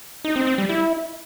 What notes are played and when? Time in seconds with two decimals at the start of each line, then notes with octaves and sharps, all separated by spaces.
0.25 D#4
0.36 C4
0.47 C4
0.58 G3
0.69 E4